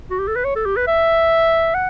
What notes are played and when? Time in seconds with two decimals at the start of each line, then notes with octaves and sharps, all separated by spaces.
0.11 F#4
0.19 G4
0.28 A4
0.36 B4
0.45 C#5
0.56 A4
0.66 G4
0.77 B4
0.88 E5
1.75 F#5